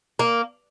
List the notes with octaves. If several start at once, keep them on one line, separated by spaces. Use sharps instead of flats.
A#3